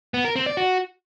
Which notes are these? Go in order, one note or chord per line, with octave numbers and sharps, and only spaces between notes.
B3
A#4
C4
D5
F#4